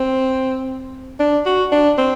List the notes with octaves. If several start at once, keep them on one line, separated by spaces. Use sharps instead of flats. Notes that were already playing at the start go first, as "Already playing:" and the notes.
Already playing: C4
D4
F#4
D4
C4